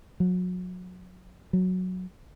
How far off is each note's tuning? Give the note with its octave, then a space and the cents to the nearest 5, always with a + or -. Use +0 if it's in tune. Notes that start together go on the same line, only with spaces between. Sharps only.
F#3 -30
F#3 -5